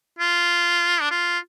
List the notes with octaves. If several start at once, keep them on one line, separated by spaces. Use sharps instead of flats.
F4
D4
F4